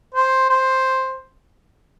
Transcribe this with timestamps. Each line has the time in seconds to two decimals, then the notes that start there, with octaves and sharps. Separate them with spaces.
0.14 C5
0.49 C5